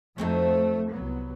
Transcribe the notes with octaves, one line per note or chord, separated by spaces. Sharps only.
F2 F3 F#3 A3 C4 D#4
C2 F#3 B3